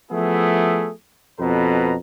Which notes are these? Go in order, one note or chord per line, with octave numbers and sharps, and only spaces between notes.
F3 A3 B3 E4 G#4
F2 B2 A4 B4 A#5